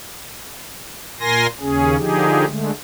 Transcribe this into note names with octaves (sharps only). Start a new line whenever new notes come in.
A#2 A#4 G#5 C6 A#6
D#2 C#3 C#4 G#4
D3 F3 D#4 G4 G#4
D3 G#3 A3